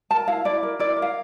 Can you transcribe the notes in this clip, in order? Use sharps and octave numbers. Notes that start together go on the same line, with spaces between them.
A#4 A5
E4 F5
E4 D5
A#4
E4 D5
A#4
F5